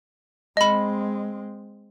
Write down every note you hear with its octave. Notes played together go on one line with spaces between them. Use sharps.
G#3 C4 D#5 B5